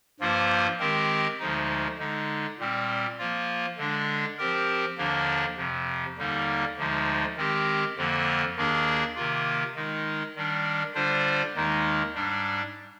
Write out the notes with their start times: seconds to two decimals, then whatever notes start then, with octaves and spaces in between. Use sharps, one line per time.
0.20 G2 F3 A#3 F4 C5
0.80 D#3 G#3 C4 G4 A#4
1.40 D2 D3 F3 G#3 D#4
1.99 D3 G#3 D#4
2.59 A#2 G3 C4
3.18 F3 A#3 F4
3.78 D3 G#3 D4
4.38 F3 C4 G4 A#4
4.98 D#2 D3 F3 A#3 D4
5.57 F2 C3 F3
6.17 D#2 D3 G3 A#3 D#4
6.77 D2 D3 F3 G#3 D#4
7.37 D#3 G#3 C4 G4
7.96 F2 D3 F3 A#3
8.56 D#2 D#3 A#3 D4 G#4
9.16 C3 D#3 A#3 F4
9.75 D#3 G#3 D#4
10.35 D#3 G3 D4
10.94 D3 G3 D4 F4 C5
11.55 D#2 D#3 G#3 D#4
12.15 G#2 G3 D4